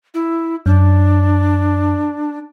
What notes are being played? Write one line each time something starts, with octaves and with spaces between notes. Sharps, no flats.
E4
F#2 D4